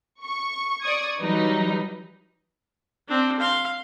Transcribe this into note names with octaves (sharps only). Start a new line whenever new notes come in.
C#6
D5 C#6 D#6 G#6
E3 F#3 G3 D#4 B4
C4 D4
F5 C6